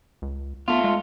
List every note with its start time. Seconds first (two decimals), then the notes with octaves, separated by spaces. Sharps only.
0.22 C#2
0.68 A3 B3 F4
0.84 G#3